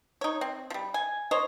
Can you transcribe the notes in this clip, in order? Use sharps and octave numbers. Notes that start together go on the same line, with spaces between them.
D#4 C#5
C4
F3 G3
G#5
C5 C#5 D#5